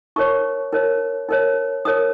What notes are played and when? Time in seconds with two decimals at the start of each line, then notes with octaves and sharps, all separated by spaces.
0.16 D#4 A#4 C#5 C#6
0.72 D#4 A#4 C#5
1.29 D#4 A#4 C#5
1.85 D#4 A#4 C#5 D#6